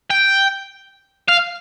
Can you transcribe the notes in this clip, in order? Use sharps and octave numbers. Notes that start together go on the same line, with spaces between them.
G5
F5